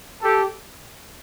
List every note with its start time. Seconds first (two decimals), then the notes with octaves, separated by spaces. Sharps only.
0.22 G4 A4